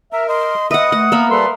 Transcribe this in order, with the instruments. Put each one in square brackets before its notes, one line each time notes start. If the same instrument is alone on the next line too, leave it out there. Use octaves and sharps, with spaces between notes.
[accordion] A#4 [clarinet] E5 [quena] A#5
[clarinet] D#5 [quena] C6
[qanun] B4 F#5 [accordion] D#5 [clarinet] E5 [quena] D#6
[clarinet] A3 [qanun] F#5
[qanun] A#3 E5 B5 [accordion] B3 [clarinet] A#4
[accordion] G3 A4 [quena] B4 [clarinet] C6